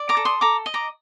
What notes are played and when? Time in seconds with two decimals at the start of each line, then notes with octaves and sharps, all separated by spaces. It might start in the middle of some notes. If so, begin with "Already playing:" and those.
Already playing: D5
0.09 A#5 D6
0.17 A4
0.25 C6 D#6
0.41 A4 A#5 D6
0.66 D#5
0.74 A#5 D6